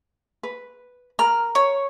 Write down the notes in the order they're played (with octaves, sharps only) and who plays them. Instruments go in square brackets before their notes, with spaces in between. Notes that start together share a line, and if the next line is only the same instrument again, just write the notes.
[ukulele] B4
[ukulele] A#4 A#5 B5 [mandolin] F6
[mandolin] C#5